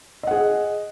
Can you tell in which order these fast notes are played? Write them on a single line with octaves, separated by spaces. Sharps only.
D#5 F#5 G#4